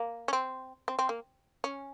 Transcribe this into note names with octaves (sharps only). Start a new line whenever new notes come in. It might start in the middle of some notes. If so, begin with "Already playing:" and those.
Already playing: A#3
C#4
C4
C4
C4
A#3
C#4